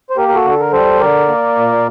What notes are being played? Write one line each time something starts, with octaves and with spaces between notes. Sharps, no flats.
C5
A#3 G4 A#4
A#4
F#4 A4
D3
A4
A#4
G3 A4 C5
D3 A#4 D5
A#3
A#2